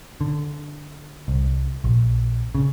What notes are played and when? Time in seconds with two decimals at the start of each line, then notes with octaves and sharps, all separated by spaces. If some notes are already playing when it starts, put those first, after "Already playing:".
0.21 D3
1.28 C2
1.84 A#1
2.55 C#3